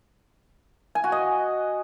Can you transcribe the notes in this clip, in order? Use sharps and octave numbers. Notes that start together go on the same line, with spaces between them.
G#5
F#4
D#5